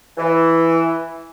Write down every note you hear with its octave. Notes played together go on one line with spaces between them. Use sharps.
E3